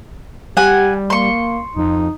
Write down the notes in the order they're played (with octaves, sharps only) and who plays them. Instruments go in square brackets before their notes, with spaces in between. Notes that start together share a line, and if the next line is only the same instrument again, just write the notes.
[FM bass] G3 [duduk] G4 [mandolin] F#5 G#5
[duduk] A#3 [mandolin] C6 C#6
[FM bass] F2 [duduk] D#4